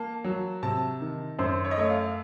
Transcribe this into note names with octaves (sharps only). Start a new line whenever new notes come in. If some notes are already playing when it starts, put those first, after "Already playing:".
Already playing: A#3 A5
F#3
C3 A5
D#3
F#2 C5
C#5
D#5
A3 C#5
F5